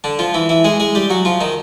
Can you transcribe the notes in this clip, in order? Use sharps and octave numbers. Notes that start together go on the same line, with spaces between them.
D3 D4
F3 F4
E3 E4
E3 E4
G#3 G#4
G#3 G#4
G3 G4
F#3 F#4
F3 F4
D#3 D#4